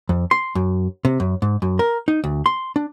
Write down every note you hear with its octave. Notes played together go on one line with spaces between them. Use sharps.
F2
C6
F#2
C3
F#2
G#2
F#2
A#4
D#4
D2
C6
D4